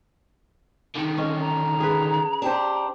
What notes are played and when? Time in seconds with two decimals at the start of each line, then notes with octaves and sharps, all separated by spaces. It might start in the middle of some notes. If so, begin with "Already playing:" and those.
0.96 D3 D#3
1.18 C#4 D#5
1.41 A#5
1.80 G#4 B4
2.42 D4 G4 C5